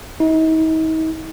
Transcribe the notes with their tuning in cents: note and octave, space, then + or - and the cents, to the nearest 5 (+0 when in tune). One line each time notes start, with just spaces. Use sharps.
D#4 +40